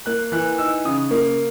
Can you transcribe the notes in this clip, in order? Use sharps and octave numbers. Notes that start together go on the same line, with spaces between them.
A#3 F#6
E3 F#6
D#4 E6
C#3 D#6
A#3